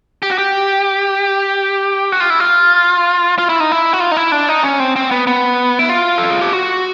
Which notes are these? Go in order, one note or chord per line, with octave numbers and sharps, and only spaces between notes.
G4
F#4
G4
F#4
F4
E4
F4
F4
E4
D#4
E4
F#4
F4
D#4
E4
D4
D#4
C#4
C4
C4
B3
B3
E4
F4
A4
G#4
G4
F#4